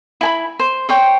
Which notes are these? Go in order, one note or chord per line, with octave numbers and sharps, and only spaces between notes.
E4 G#5 B5
C5
C5 C#5 G5